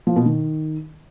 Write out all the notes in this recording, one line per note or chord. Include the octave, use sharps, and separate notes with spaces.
F3
B2
D#3